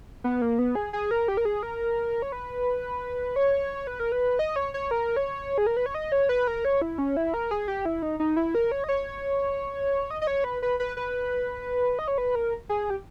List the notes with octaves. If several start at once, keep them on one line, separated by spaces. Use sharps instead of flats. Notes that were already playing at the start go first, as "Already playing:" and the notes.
B3
A#3
B3
G#4
G#4
A#4
G4
A#4
G#4
A#4
C#5
B4
C#5
B4
A#4
B4
D#5
C#5
C#5
A#4
C#5
G#4
A#4
B4
C#5
D#5
C#5
B4
A#4
C#5
E4
C#4
E4
A#4
G#4
G4
E4
D#4
D#4
E4
A#4
C#5
D#5
C#5
D#5
D#5
C#5
B4
B4
B4
B4
D#5
C#5
B4
A#4
G#4
G4